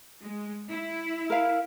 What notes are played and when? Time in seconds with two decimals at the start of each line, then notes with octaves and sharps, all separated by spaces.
0.23 G#3
0.70 E4
1.30 A#4 F5